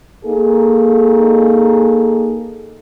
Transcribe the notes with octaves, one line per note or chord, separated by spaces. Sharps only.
A#3 D#4 G#4 A4